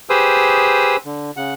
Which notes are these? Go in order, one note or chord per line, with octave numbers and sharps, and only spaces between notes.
G4 G#4 B4 C5 D#6 E6
D3
C#3 F#5